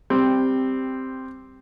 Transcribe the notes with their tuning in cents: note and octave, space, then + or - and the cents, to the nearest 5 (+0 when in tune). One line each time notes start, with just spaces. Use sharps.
G3 +5 C4 +0